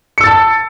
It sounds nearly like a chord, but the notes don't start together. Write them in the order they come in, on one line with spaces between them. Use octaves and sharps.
C#7 E6 A6 A5